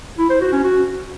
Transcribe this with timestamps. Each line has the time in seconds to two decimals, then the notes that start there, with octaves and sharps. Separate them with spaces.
0.18 E4
0.30 C5
0.41 F#4
0.52 C#4
0.64 F#4